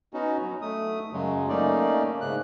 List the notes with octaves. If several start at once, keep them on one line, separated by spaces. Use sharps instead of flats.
B3 C#4 D#4 F#4
F#3
A3 D#6
F#2 C#3 F#3 G#3
A3 A#3 C#4 D#4 D5
G#2 C#3 F#6